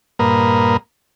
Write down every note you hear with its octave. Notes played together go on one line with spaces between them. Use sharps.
G2 A#2 A#3 A#4 B4 D#6